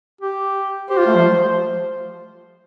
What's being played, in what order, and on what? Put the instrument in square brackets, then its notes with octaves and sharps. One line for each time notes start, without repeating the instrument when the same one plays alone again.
[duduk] G4
[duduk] G4 [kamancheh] C5
[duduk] F4
A3
F3